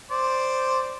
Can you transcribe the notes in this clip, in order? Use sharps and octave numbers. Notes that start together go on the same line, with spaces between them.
C5 D5